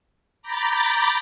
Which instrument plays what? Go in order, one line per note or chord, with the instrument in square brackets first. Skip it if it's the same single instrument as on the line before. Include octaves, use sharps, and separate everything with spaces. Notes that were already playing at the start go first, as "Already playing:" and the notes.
[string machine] A#5 B5 D6 G6 A6 A#6